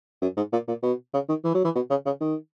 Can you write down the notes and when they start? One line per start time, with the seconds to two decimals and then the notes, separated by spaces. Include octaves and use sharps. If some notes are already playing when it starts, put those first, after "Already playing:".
0.22 F#2
0.37 G#2
0.53 A#2
0.68 A#2
0.83 B2
1.14 C#3
1.29 D#3
1.45 E3
1.55 F#3
1.65 E3
1.76 B2
1.90 C#3
2.06 C#3
2.21 D#3